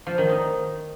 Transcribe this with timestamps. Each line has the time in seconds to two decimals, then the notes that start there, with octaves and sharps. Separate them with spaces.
0.07 F3
0.18 D#3
0.29 D#4